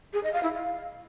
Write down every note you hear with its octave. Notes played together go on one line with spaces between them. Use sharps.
G#4
D#5
F5
E4
F5